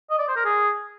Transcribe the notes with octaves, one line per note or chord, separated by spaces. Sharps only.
D#5
D5
C5
A#4
G#4